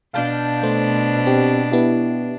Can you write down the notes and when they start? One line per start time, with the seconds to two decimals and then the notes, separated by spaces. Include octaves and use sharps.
0.14 B2 D4 F5 A5 G6
0.63 A3 C5
1.27 C4 G4
1.72 B3 E4 G4